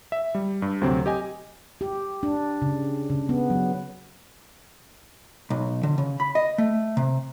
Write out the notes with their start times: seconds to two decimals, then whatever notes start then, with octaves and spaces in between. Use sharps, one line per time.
0.12 E5
0.35 G3
0.62 G2
0.81 D2 C3 F#3 C4
1.06 G4 D#5 G#5
1.81 G4
2.23 D4
2.62 C#3
3.10 C#3
3.29 B3
3.50 F#3
5.50 B1
5.83 D3
5.98 C#3
6.20 B5
6.35 D#5
6.58 A3
6.97 C3